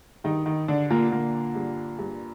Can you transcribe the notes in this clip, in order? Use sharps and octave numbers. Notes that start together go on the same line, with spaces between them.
G2 D#3 D#4
D#3 D#4
D3 D4
A#2 A#3
A#2 D3 A#3
G2
G2